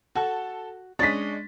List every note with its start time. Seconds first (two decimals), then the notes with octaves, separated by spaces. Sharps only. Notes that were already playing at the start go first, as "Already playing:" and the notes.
0.15 F#4 A4 A5
0.99 G#3 C#4 D4 C#5 D#5 A6 B6